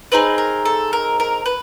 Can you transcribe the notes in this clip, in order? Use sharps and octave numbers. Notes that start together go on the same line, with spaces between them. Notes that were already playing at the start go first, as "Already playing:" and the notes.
C4 D#4 G#4 B4
A#4
A4
A#4
A#4
B4